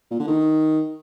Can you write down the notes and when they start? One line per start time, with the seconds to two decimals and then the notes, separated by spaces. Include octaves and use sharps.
0.11 A#2
0.19 D3
0.27 D#3